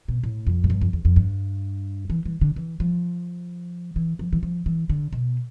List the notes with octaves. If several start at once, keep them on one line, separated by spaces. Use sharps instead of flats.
B2
A2
F2
A2
G2
F2
E2
F2
G2
E3
E3
D3
E3
F3
E3
F3
E3
F3
E3
D3
B2